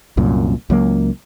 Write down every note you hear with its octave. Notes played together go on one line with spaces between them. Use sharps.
C2 F#2 A#2
C#2 F#3 A#3